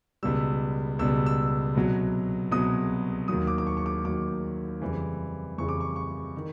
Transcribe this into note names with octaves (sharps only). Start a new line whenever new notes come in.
C#2 B2 G3 E6
C#2 B2 G3 E6
E6
C2 B2 F#3
C2 B2 F#3 D#6
D#2 D#3 F#3 D#6
D6
D6
C#6
C#6
D6
D#2 D#3 F#3 D6
F2 C#3 E3 G3
F2 C#3 E3 G3 C#6
D6
C#6
C#6
D#3